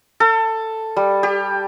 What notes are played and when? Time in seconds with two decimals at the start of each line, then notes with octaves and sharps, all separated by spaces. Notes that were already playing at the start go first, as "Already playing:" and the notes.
0.20 A4
0.96 G3
1.23 G4